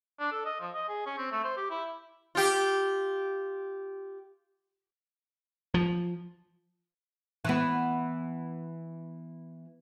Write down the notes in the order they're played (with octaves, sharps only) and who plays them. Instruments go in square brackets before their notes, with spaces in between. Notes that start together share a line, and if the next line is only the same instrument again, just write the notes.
[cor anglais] D4
A4
D#5
F3
D#5
G#4
C#4
C4
A3
C5
G4
E4
[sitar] F4 G4
[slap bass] F3
[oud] E3 B3